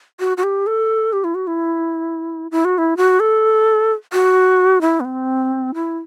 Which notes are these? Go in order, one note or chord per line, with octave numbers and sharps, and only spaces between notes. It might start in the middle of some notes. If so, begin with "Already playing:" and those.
F#4
F#4
G4
A4
G4
E4
F#4
E4
E4
F#4
E4
F#4
A4
F#4
E4
B3
C4
E4